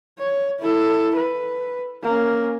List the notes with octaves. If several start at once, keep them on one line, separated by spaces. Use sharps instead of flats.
C#5
E4 A4
B4
A#3 C#4